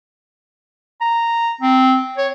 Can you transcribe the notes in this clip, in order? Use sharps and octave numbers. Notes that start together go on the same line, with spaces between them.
A#5
C4
C#5